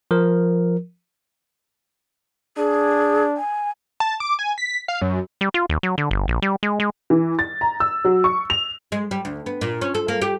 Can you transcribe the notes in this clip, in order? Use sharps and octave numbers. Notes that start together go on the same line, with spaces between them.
F3 A#4
D4 G#4
G#5
A5
D6
G#5
B6
F5
F#2
G3
F4
D#2
F#3
D3
G1
A#1
G3
G#3
G#3
E3
A6
A#5
E6
F#3
C#6
F7
G#3
G3
D2
B3
A#2
C#4
A4
A#3
G4